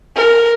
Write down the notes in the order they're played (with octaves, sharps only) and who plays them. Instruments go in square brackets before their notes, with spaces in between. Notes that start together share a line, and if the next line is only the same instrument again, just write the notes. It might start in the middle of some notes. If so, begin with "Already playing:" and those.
[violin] A#4